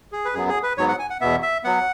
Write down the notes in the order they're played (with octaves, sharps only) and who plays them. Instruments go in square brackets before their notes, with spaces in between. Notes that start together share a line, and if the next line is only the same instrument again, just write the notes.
[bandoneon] G#4
B4
F#2 F#3 B3 G#4
G#4
B4
G#2 F#3 B3 C#5
F#5
G#5
F#5
E2 B2 B3 E5
E5
F#3 B3 F#5